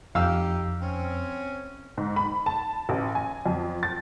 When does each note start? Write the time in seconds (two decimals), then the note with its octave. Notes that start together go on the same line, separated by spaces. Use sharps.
0.15 F2 D#4 G4 F5 E6
0.81 C4 C#4
1.98 G#2
2.16 B5
2.46 A5
2.89 A1
3.15 G#5
3.46 F2
3.83 A6